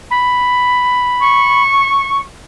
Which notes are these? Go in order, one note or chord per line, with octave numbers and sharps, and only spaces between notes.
B5
C#6